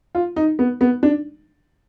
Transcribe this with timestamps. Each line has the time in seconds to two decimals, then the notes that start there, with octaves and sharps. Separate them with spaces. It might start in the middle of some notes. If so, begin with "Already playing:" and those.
0.15 F4
0.36 D#4
0.59 B3
0.81 B3
1.03 D4